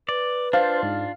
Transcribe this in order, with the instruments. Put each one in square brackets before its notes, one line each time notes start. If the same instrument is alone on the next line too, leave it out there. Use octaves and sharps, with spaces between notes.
[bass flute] B4 [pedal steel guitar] D5
[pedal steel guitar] D4 F4 [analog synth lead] C5 [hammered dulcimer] F5
[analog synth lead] G#2